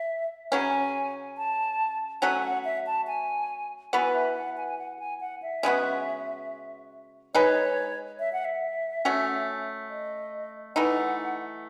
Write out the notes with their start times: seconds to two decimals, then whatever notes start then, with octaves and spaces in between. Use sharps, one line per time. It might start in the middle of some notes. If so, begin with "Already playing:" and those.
Already playing: E5
0.52 C#3 F#3 C#4 G#5
1.38 A5
2.22 F#3 A3 C#4 F#4 G#5
2.43 F#5
2.65 E5
2.86 A5
3.07 G#5
3.93 E3 B3 F#4 B4 G#5
4.14 E5
4.35 F#5
4.57 G#5
4.68 G#5
4.79 F#5
4.99 G#5
5.21 F#5
5.42 E5
5.63 C#3 G#3 B3 F#4
7.34 G#3 D#4 G#4 B4 C#5
8.19 E5
8.33 F#5
8.45 E5
9.05 A3 C#4 F#4
9.90 D#5
10.76 E3 A3 D#4 F#5